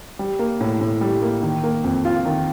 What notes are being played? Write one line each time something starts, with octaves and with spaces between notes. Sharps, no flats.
G3
A#3
A2
A2
G3
A#3
D#3
A#3
F2
F4
D#3